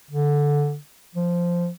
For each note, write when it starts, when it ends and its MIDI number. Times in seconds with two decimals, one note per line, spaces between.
0.11 0.77 50
1.15 1.70 53